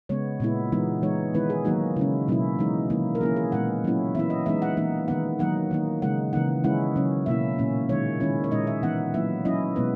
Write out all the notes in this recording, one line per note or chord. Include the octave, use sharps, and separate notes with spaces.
C#3 G#3 B3 C#5
A#2 G#3 B3 E4
E3 G#3 B3 D#4
E3 G#3 D#4 C#5
D#3 G#3 B3 E4 B4
G#4
D#3 F#3 A#3 D#4 F#4
C#3 G#3 C#4 E4
B2 F#3 A#3 C#4 E4
E3 G#3 D#4
D#3 F#3 A#3 E4
A#4
E3 A#3 C#4 E4 G#4
G#4
A#2 G#3 B3 F#5
F#3 A#3 C#4 E4
E3 B3 E4 E5
D#5
E3 G#3 B3 D#4 E5
F#5
E3 A#3 D#4
D#3 G#3 B3 D#4 F#5
D#3 F#3 A#3 D#4 F#5
D#3 A#3 D#4
C#3 G#3 D#4 F#5
C#3 E3 A#3 D#4 F#5
D#3 G#3 C#4 E4 F#5
C#3 F#3 C#4
B2 A#3 E4 E5
A#2 A#3 C#4
D#3 G#3 D#4 C#5
D#3 G#3 C#4 E4
C#5
A#2 G#3 D#4 D#5
E5
E3 B3 D#4 F#5
F#3 A#3 E4 E5
F#3 C#4 E4 D#5
B2 G#3 B3 B4